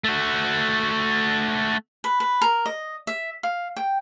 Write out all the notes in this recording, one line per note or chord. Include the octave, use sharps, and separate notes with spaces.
A3 F#4
B4
B4
A#4
D#5
E5
F5
G5